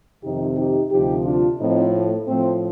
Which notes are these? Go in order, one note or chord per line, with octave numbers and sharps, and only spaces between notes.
F2 C3 D#3 D#4 G4
D#4 G4
D2 C3 F3 D#4 G4
D4 F4
A2 F3 C4 D#4
A3
A2 F3 A3 C4